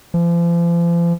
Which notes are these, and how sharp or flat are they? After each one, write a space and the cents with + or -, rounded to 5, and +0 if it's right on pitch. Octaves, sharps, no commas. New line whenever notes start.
F3 -40